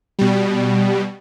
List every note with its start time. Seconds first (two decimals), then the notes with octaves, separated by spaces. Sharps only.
0.19 B2 G3